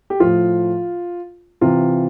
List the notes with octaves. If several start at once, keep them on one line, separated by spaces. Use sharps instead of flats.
G4
A2 F3 F4
C3 E3 F4